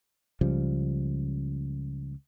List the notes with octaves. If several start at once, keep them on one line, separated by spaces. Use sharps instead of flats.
C#2 C#3 F3 G3